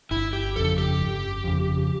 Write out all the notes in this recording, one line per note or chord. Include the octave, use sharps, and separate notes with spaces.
G1 E4
G4
F2 C#3 A4
G4
G1
F2 C#3